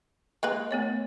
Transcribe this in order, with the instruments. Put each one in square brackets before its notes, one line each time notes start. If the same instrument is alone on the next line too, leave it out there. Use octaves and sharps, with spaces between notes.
[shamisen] G#3 A#3 B4
[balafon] A3 B3 C#5